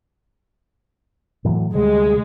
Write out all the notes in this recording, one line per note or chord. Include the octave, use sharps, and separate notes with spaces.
A2 E3 F#3
D2 C3 G3 G#3